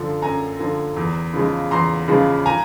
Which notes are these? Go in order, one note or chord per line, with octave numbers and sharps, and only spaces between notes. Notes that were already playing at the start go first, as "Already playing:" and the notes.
Already playing: F#2 D3 F3
F#2 G#5 A#5
D3 F3
E2
C#3 F3 G#3
E2 A#5 C6
C#3 F3 G#3
G#5 A#5